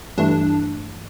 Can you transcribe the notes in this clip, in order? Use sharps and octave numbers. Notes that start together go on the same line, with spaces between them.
G2 E3 A3 D4